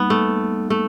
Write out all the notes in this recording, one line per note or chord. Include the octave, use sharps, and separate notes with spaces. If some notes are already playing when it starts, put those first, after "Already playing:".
Already playing: G3 A#3 B3 D#4
A3
A3